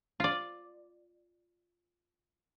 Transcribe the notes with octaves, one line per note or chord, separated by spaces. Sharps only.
F4 D5